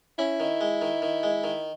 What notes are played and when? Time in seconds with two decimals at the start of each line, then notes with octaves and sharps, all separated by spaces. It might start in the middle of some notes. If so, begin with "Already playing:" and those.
0.19 C#4 E4
0.40 D#3
0.61 G#3
0.82 D#3
1.02 D#3
1.23 G#3
1.44 D#3